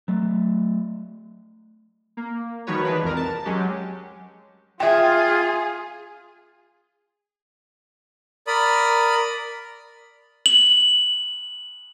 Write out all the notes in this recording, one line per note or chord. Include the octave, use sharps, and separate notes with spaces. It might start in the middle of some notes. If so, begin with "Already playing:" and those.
F#3 A3
A#3
D#3 F3 G3 F#4 B4 C#5
E3 G#3 D4 B4
C2 F2 D#3 A#4
A5
F#3 G#3 C#4 G4
F4 G#4 E5 G5
A#4 D5 B5 D#6
F#7